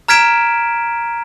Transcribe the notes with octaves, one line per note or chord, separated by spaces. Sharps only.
A#5 F6 G#6 B6 D7 E7